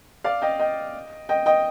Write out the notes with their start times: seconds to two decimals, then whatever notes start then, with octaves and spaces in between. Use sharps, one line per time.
0.24 D5 F5
0.42 D#5 G5
0.59 D#5 G5
1.29 D#5 G5
1.46 D#5 G5